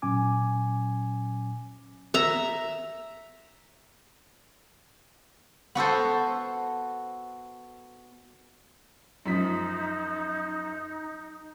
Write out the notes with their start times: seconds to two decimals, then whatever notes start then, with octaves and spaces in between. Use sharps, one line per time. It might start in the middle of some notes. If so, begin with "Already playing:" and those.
0.02 A#2 F#3 C#4 G#5 D6
2.14 E5 A#5
5.75 B3 F#4 A4 C5
9.26 F#2 F3 D#4 B6